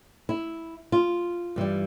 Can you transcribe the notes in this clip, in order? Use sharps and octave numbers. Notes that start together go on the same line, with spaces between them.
E4
F4
G2 E3 G3